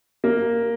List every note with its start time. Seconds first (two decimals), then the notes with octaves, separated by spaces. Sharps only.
0.24 A#3